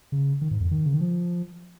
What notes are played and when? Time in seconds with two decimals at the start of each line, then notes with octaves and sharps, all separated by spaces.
0.12 C#3
0.41 D#3
0.51 G#2
0.60 F2
0.71 D#3
0.86 C#3
0.93 D#3
1.01 F3